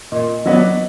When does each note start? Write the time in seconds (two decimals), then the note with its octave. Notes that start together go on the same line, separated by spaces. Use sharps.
0.12 A#2 D#5
0.45 F#3 B3 D4 D#5